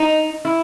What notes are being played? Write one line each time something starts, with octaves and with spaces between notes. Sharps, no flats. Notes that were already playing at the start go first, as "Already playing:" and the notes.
Already playing: D#4
E4